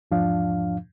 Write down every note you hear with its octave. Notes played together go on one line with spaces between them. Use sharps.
E2 G#2 F3 D4 F5